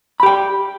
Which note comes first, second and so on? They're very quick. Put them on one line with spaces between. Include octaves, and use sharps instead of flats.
B5 G4 G5